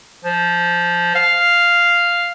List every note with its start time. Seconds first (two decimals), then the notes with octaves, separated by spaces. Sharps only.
0.25 F3
1.15 F5